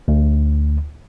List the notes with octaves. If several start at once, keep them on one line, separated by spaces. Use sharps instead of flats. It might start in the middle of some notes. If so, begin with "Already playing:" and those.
D2